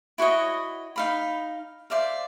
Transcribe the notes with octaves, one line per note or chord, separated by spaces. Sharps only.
E4 F#4 C#5 D#5
D#4 F5 B5
C5 D5 E5 F5